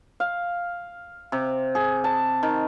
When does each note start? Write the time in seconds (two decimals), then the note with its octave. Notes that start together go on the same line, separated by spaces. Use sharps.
0.20 F5
1.32 C3
1.75 G#4
2.04 A5
2.43 D#3